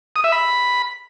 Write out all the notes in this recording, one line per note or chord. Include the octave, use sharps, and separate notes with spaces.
D#6
E5
B5